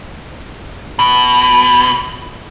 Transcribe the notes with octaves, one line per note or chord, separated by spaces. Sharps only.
B2